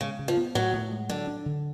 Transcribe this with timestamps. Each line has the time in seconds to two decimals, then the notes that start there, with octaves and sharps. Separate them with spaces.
0.01 C#3 G#3
0.19 C#3
0.28 F3
0.37 B3
0.55 A2 F#3
0.73 A2
0.92 G#3
1.09 D3 F#3
1.27 D4
1.46 D3